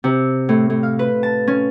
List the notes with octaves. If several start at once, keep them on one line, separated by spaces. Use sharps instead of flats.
C3
A2
A2
F5
B4
A5
C#4